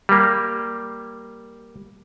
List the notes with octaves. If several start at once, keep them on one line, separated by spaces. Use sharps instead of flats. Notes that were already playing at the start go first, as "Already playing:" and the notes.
G3 A#3